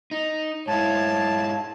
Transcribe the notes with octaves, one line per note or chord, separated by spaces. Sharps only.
D#4
G#2 E4 C#5 F5 A5